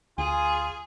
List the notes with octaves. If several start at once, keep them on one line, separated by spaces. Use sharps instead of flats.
D2 F4 G#4 G#5